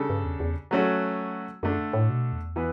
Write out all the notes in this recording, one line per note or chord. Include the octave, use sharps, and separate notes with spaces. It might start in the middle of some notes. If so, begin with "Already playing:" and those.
Already playing: C#3 G3 D4 A4
G2
E2
E2
F#3 A3 C#4 F#4
F#2 D3 A3 D4
A2
B2
E2
E3 B3